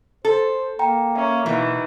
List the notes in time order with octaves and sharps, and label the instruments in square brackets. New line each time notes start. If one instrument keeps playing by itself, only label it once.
[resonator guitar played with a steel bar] A4 [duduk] C5
[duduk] A#3 [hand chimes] G5 A#5
[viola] C#4 [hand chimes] E5 A#5
[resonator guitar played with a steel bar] B2 [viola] D#3 E3